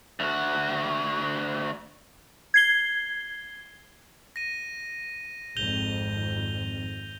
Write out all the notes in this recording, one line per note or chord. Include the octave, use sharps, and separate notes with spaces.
D2 F#4
G#6 C7 G7
A#6 D#7
G#1 F2 G6 F7 G7